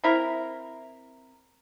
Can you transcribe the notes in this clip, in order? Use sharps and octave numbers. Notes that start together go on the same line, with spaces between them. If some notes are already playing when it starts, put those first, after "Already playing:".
C4 E4 A#4